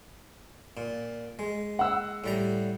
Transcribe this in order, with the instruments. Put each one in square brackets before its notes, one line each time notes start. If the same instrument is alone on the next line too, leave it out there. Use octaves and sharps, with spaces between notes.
[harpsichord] A#2
G#3
[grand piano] F#5 E6
[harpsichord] A2 G3 A#5